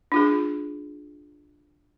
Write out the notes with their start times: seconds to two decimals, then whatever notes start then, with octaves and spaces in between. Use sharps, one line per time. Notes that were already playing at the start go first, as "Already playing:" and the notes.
0.12 D4 F4 G#4